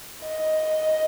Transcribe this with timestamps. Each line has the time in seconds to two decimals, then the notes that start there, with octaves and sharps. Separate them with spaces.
0.23 D#5